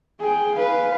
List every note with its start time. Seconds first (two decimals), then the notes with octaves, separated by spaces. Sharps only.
0.20 G#4 G5
0.54 B4 F5